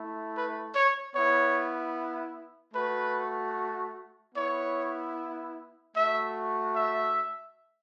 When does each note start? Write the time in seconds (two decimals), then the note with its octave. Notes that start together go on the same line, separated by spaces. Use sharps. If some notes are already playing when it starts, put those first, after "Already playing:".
Already playing: A3 E4
0.34 B4
0.74 C#5
1.14 B3 E4 C#5
2.74 A3 F#4 B4
4.34 B3 E4 C#5
5.94 A3 F#4 E5
6.74 E5